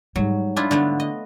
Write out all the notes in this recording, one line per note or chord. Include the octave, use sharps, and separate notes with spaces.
G#2 F#3 G3
D4 E4 F4
D3 A3 B3
D#5